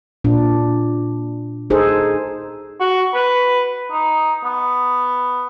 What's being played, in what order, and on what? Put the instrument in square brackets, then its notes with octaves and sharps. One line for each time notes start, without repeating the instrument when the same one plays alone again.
[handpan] A#2 D4
D#4 G#4 A4 C5
[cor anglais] F#4
B4
D#4
B3